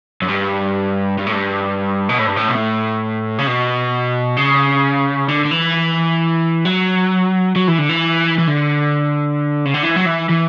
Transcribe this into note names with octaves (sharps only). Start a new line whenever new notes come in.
F#2
G2
G2
A2
G2
B2
A2
G2
A2
B2
A2
C#3
B2
C#3
D3
D3
E3
F#3
F#3
E3
D3
E3
E3
D3
C#3
D3
E3
F#3
E3
E3